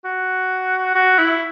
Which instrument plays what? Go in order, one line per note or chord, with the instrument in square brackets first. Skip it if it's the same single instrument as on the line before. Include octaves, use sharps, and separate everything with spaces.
[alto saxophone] F#4
F#4
E4